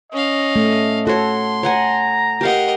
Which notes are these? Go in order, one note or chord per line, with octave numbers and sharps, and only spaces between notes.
C#4 D#5 F5
A3
F#4 A4 C#5 C6
C#5 F#5 G#5 A#5
G4 A#4 D#5 F5 F#5